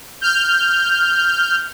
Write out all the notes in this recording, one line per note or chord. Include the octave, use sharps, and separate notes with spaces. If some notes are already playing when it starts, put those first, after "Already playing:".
F6 G6